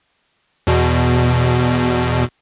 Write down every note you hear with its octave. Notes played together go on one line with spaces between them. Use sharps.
E2 B2